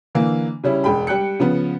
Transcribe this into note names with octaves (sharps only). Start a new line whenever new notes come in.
D3 E3 A#3
C#3 G3 C#4 E4
E1 G#3 G5 B5
G3 G5 F#6 C#7
C#3 F3 B3